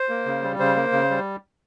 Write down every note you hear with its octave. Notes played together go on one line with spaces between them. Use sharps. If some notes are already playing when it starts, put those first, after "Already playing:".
Already playing: C5
A#3
C#3
G3
C#3 C5
A#3
C#3
G3